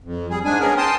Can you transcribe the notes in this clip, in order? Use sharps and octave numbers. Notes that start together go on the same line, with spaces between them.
F2
G3 G#4
G#2 G#3 D4 G#5
B3 C#4 G#4 A#4
G5 A5 C6 D#6